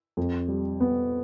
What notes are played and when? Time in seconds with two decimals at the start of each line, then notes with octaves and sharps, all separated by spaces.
0.17 F2
0.48 G3
0.80 B3